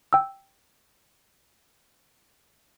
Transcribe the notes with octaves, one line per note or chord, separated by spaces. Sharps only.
G5 E6